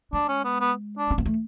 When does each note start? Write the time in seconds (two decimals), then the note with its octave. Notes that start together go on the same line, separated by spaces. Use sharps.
0.13 G#3 D4
0.29 C#4
0.45 B3
0.60 B3
0.98 D4
1.11 C#4
1.18 B3
1.26 A3